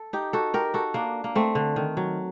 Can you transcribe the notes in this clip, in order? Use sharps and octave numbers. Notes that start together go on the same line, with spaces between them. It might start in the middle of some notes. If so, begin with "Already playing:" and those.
Already playing: A4
D#4 G4
F#4 A4
G4 A#4
F#4 A4
A#3 D4
A#3
A3 C4
D3
D#3
F#3